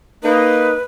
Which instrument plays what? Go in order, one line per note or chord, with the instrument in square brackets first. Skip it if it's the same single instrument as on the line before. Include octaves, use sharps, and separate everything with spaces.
[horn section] A#3 D#4 [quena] B4